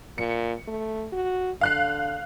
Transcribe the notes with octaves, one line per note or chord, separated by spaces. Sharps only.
A#2 C#7
A3
F#4
D3 F5 F#6 C7